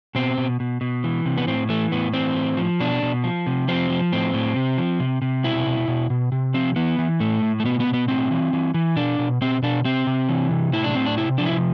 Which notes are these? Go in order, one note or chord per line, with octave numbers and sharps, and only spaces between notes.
B2 C4
B2
B2
B2
E3
C3
B3
A2 C4
E3 A3
A2 B3
E3 C4
A2
F3
B2 D4
B2
F3
C3
F3 C4
F3
A2 C4
A2
C3
F3
C3
C3
B2 E4
B2
B2
B2
C3
F3 C4
E3 B3
E3
A2 A3
A2
A3
B2 B3
B3
B2
B3
A2 C4
E3
E3
E3
B2 D4
B2
B2 C4
B2 D4
C3 C4
C3
E3
C3
A2 E4
D4
A2 C4
D4
C3 E4
F3 D4
E4